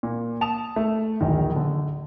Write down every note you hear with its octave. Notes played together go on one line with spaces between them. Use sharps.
A#2
A5 D#6 E7 F7
A3
D1 A#1 D#3
D3